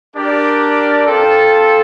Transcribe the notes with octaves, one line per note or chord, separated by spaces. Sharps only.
D4 G4 A#4 D5
C4 F4 A4